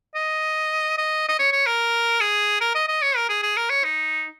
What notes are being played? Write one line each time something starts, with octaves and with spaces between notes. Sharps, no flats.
D#5
D#5
D#5
C#5
C#5
A#4
G#4
A#4
D#5
D#5
C#5
A#4
G#4
G#4
A#4
C#5
D#4